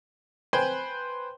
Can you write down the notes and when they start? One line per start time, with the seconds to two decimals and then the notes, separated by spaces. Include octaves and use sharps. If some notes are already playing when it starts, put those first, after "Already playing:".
0.53 B4 C5 G5 G#5 C6